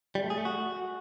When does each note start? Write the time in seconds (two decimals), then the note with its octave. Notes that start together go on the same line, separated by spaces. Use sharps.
0.15 G3
0.23 A3
0.30 G#4
0.38 A3
0.45 F#4